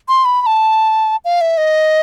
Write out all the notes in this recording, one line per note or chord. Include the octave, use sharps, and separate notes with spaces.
C6
B5
B5
A5
F5
E5
D#5